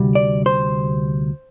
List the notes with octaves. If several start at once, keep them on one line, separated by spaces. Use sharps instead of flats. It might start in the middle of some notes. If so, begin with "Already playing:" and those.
Already playing: D2 C3 G3
D5
C5